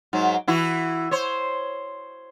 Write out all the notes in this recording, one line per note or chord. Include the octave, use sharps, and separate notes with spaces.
G#2 F#3
E3 E4 F#4
C5 C#5